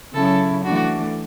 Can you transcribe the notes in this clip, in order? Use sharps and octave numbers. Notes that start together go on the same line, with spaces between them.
C#3 F#3 C#4 E4 A4
E3 A3 D4 F#4